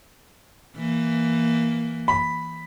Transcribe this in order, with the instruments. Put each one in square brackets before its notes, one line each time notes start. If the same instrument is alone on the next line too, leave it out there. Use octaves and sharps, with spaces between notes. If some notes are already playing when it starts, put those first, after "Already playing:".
[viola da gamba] E3 A#3
[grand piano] B5